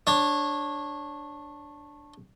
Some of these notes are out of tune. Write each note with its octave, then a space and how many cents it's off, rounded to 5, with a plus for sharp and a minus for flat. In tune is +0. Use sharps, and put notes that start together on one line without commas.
D4 +0 C#5 -20